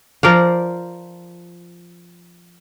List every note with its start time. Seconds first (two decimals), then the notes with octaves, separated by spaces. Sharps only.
0.23 F3 A#4 D5 F5